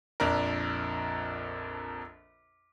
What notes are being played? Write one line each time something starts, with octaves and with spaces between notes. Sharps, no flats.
A#1 F2 D4 A#4